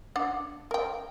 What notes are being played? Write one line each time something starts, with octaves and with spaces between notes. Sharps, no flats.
D4 F#5
A#4 G5